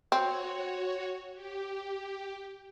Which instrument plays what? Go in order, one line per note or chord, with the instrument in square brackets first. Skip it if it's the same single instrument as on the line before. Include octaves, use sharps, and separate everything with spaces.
[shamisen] C4 [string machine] F#4 C#5
[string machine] G4